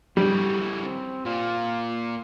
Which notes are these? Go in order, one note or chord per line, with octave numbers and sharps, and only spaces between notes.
C#3 E3 G3
C4
A#2 F4